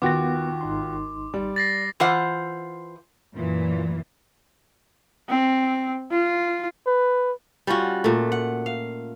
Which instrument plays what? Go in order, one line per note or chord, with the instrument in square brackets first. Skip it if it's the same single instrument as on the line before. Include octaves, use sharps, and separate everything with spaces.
[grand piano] D#2 F#4 [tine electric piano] B3 A#6 [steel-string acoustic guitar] F4 G5 [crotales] D6
[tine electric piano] G#1 D#4 C6
[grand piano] G3 [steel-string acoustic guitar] D5
[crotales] A6 A#6 C7
[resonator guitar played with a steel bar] E3 F4 C5 F#5
[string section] F#2 A#2 E3
[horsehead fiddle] C4
F4
[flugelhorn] B4
[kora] G3 C#4 F4 F#4
A#2 A3
F#5
F5